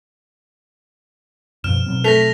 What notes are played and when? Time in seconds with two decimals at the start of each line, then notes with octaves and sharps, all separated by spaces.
1.64 F#2 B2 F3 F6 E7
1.86 B2 F#3 C4
2.04 A3 A#6 B6 F7